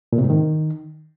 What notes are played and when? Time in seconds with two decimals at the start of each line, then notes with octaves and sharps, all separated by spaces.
0.13 A#2
0.18 C3
0.24 G#2
0.30 D#3